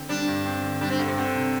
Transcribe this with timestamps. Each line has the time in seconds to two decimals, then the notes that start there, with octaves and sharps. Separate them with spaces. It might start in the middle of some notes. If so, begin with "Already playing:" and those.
Already playing: D3 C4
0.09 G3 D4
0.28 G2
0.46 C4
0.63 D3
0.81 G3 D4
0.90 C4
0.99 G2 D3
1.08 C3
1.17 D3 C4
1.35 C3